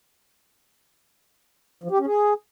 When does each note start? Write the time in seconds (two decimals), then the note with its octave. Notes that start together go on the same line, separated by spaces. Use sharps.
1.83 F3
1.91 G4
1.99 C#4
2.06 G#4